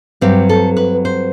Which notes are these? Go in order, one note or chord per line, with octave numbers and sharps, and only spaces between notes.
G2 F#3 C4 G4
A4
B4
C5